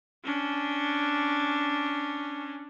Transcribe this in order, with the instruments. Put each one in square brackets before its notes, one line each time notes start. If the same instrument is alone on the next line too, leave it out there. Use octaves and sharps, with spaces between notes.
[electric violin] C#4 D4